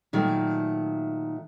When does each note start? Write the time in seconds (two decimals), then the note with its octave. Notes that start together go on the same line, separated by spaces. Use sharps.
0.13 A#2 D#3 F#3 A3